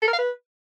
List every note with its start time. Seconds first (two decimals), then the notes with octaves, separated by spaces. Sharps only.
0.02 A4
0.08 A#4
0.13 F5
0.18 B4